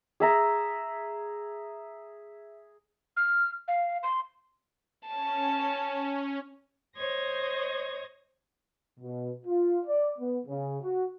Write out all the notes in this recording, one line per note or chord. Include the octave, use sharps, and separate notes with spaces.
G#4 E5 A#5
F6
F5
C6
C#4 A5
C5 C#5 D#5 G#6 A#6
B2
F4
D5
B3
C#3
F#4